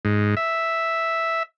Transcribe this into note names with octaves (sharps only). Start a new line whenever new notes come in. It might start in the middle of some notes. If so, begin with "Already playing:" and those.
G#2
E5